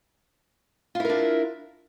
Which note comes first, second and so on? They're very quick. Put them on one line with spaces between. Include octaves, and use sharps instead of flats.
F4 E4 A#4 D4